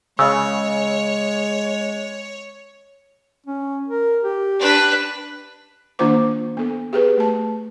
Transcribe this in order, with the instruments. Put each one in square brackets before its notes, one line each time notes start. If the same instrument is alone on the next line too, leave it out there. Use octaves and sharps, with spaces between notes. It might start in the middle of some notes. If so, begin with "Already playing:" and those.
[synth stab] C#3 [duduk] G#3 [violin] C#5 [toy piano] D#5 E6
[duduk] C#4
A#4
G4
[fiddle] D4 B4
[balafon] D#3 A#3 D4 F4 C5 D6
B3 A4
G4 G#4 B4
A3 A5